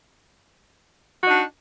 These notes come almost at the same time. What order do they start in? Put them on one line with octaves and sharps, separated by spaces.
F#4 D#4 D4